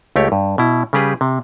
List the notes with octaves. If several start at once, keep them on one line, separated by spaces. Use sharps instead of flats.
C#2 A3 G4 C#5
G2
B2 E4
C#3 G3 G4 G#4 B4
C3